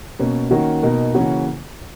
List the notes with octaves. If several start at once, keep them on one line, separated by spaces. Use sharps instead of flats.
B2 A#3 C#4
D#3 A#3 C#4 F#4 A#4
B2 A#3 D#4 A#4
C#3 E3 A#3 C#4 F#4